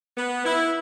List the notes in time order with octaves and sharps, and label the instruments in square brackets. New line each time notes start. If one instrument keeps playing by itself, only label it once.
[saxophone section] B3
E4